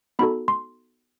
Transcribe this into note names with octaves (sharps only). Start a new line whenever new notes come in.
B3 D#4 F#4 A4 B5
C6